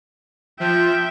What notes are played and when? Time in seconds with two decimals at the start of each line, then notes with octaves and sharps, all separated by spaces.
0.60 F3 E5 G5